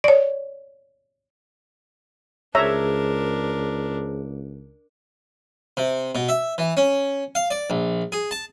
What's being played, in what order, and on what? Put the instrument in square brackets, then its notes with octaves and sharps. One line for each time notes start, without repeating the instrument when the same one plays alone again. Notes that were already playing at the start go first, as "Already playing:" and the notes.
[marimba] C#5 D5
[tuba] C#2 [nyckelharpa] D4 A#4 [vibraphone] G#4 C5 [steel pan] C#5 E5 A#5
[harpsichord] C3
B2
E5
E3
C#4
F5
D5
A#1
G#4
A5